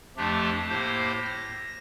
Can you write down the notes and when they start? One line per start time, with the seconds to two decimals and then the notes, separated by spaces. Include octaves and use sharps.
0.17 F2 F3 A3 D4 G4
0.69 A2 A#3 G4 C5
1.26 A#6